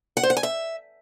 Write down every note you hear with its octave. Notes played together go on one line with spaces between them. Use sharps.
F#5
C5
F#5
G#5
E5